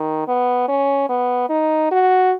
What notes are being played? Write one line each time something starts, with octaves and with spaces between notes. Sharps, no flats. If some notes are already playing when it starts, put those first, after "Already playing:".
Already playing: D#3
B3
C#4
B3
D#4
F#4